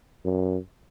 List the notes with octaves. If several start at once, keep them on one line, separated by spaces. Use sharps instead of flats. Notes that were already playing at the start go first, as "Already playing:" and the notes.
F#2